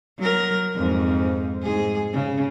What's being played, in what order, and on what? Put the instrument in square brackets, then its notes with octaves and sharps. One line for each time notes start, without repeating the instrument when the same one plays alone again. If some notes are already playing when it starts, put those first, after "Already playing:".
[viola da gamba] F#3 A#4
F2 G#2
G#2 G#4
C#3